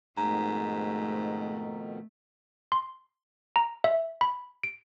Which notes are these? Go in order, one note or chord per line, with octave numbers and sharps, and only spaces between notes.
F2 G#2 B2 D#3 A3 A#5
C6
A#5
E5
B5
D7